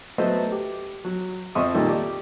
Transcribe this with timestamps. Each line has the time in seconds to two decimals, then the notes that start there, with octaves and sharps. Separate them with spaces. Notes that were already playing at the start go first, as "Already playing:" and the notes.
0.18 F#3 A3 B3 C5 D#5 E5
0.52 G4
1.05 F#3
1.55 F2 C4 E5 C6 C#6 D#6
1.74 A#2 D#3 G3 D#4 F4 A4
1.88 G4 D5